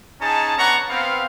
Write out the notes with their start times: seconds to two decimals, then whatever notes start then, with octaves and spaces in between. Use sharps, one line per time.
0.21 C#4 D#4 G#4 A5
0.57 B3 C#4 D4 F#5 A#5 C#6
0.89 B3 C4 F5